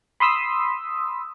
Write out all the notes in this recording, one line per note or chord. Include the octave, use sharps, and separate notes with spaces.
B5 C6 D#6 E6 B6